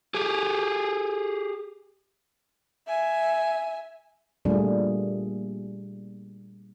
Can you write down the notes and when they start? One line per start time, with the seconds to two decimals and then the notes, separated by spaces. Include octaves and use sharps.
0.14 G4 G#4
2.88 E5 G#5
4.45 A#2 G3 A3 A#3 D4 G#4